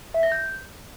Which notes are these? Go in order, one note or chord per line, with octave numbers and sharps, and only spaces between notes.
E5
A#6
G6